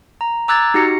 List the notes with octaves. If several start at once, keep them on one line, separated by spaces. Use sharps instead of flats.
A#5
A#5 D6 E6 F#6 G#6 A6
D#4 F#4 G4 A#6 C#7